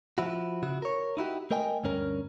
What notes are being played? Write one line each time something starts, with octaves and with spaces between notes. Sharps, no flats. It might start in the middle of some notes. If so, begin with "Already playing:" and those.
F3 E4 F#4
C#3 E4 F#4
A#4 C#5
D#4 E4 F#4 G4
A3 A#4 D#5 G5 G#5
D2 G2 C#4 A#4